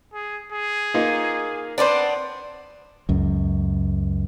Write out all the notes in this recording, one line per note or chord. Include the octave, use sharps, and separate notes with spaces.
G#4
G#4
A#3 D#4 F4
B3 C4 D4 C5 D5
C#2 F#2